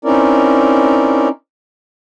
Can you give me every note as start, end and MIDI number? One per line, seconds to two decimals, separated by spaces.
0.05 1.28 60
0.05 1.28 61
0.05 1.28 63
0.05 1.28 64
0.05 1.28 70
0.05 1.28 74